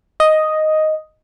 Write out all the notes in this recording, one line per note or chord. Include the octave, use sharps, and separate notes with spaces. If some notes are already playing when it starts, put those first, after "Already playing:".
D#5